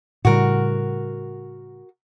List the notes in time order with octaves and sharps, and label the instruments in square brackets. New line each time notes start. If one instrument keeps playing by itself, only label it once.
[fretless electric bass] A2 C#3 G3 [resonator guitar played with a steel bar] F#4 A#4